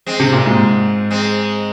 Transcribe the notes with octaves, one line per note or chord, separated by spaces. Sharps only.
G#3 C4
C3
A#2
G#2
G#3 C4